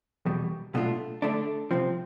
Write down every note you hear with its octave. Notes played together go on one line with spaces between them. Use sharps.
E2 B2 G3
B1 B2 A3 D4 F4
D3 A3 D4
C2 C3 F3 C4